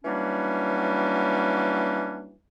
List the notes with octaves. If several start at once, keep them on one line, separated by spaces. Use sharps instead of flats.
E3 F#3 G3 A#3 C#4 D4